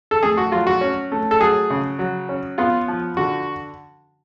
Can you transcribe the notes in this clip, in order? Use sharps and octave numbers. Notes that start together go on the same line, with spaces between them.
A4
A3 G#4
F#4
F#3 F4
F#4
C#4
A3
A4
F#3 G#4
C#3
F#3
C#4
B3 F4
F3
D3 F#4